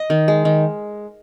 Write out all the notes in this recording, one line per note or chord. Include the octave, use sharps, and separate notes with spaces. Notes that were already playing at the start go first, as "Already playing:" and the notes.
Already playing: D#5
D#3
G#3
D#3